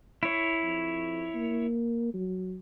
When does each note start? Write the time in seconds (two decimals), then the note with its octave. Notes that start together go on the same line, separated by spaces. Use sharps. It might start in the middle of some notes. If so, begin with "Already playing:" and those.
0.23 E4 C#5
0.63 F2
1.35 A#3
2.14 F#3